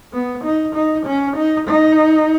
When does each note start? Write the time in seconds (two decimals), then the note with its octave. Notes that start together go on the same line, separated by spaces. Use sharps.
0.13 B3
0.44 D#4
0.75 D#4
1.06 C#4
1.36 D#4
1.67 D#4